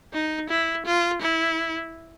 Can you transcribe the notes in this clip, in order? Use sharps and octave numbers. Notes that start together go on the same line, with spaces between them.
D#4
E4
F4
E4